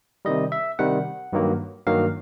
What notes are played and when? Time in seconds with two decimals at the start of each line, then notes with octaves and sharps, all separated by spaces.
0.25 C3 D#3 G3 D#5
0.52 E5
0.79 C3 D#3 G3 F#5
1.33 G2 D#3 F#3 A#3
1.86 G2 D#3 F#3 A#3 F5